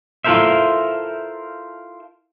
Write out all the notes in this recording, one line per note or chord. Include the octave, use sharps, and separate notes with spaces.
E4 F4 A4 A#4 C5 E5